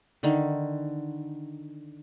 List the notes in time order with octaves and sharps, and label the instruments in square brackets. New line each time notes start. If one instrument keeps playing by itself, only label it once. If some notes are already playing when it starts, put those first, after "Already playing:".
[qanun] D3 D#3